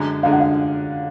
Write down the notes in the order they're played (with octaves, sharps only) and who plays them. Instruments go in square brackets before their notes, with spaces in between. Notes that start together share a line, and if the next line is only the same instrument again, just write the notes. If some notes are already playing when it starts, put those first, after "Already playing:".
Already playing: [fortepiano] F#2 D3 G#3 D4
[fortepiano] F#2 D3 G#3 D4 [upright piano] F5
[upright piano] F#5
F5